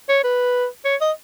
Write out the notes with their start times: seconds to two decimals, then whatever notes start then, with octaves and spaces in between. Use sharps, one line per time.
0.09 C#5
0.24 B4
0.85 C#5
1.01 D#5